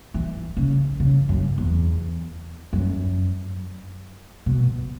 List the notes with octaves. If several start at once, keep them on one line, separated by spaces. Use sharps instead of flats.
E3
C#3
C#3
F#2
E2
F#2
B2